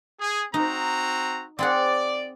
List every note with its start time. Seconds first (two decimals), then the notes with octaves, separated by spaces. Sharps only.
0.20 G#4
0.54 C4 D#4 F#4 A#5
1.59 C4 G#4 D5 F#5